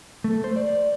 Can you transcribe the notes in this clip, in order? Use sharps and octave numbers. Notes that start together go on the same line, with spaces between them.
A3
C5
D5